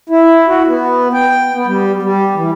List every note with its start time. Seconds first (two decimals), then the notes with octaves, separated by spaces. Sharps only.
0.10 E4
0.47 F#4
0.67 B3
1.14 G5
1.54 B3
1.67 G3
2.03 G3
2.35 E3